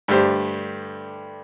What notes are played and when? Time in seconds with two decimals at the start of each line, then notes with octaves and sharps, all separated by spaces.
0.08 G2 D3 A3 G4 C5